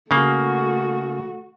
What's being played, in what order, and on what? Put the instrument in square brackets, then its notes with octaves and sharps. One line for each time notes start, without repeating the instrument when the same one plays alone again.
[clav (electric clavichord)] C#3 A#3 [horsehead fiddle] A3 F#4